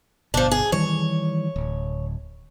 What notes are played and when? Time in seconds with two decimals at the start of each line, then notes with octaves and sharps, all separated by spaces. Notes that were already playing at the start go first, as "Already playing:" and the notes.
0.34 G1 B2 F3 D4
0.51 G#4
0.72 D#3 E3 G3 C#5
1.56 D1